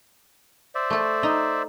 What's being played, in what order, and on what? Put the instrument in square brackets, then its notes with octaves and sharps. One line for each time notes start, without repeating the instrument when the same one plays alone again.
[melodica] C5 D5 E5
[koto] A3 A4
D#4